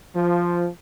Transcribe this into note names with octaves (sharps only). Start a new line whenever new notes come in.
F3